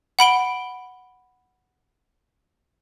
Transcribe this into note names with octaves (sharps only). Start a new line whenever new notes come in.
F#5 B5 D7 G7